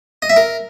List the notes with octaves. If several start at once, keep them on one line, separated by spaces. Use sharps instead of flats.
D#5
E5
A#4